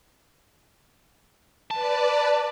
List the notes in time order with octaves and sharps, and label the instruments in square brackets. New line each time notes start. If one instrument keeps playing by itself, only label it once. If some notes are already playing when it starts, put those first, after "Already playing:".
[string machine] B4 D5 [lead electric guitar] A5